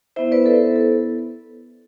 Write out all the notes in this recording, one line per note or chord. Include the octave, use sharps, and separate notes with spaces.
B3 E4 C5 E5
B4 D5
A4 C5
A4